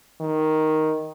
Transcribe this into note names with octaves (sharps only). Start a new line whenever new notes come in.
D#3